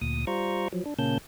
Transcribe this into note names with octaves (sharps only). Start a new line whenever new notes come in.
D2 A#2 D#6
G3 F4 C5 A#5 C#6
F3 F#3
D4
A#2 C#3 A#3 C#4 A5 G6